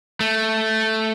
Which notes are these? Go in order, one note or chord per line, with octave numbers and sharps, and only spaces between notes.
A3